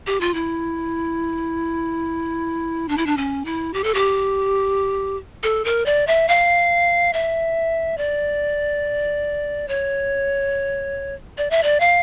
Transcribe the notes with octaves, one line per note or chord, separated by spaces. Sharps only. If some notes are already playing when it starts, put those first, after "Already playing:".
G4
F4
E4
D4
E4
D4
C#4
E4
G4
A4
G4
A4
A#4
D5
E5
F5
E5
D5
C#5
D5
E5
D5
F5